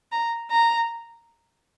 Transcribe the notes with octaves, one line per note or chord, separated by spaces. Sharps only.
A#5
A#5